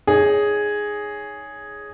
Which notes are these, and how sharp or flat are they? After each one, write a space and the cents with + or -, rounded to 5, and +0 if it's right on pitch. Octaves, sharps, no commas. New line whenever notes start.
D#4 +0 G#4 +0 C#5 +15